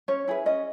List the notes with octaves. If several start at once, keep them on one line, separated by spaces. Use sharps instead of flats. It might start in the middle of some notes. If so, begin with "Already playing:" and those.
C#4 C#5
E4 G#4 B4
C#4 D#5